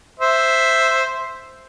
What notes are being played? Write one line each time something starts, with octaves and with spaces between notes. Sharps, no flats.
C5 E5